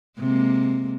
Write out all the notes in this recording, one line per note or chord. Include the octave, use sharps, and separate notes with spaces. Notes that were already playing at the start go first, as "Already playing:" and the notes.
C3 G#3 A#3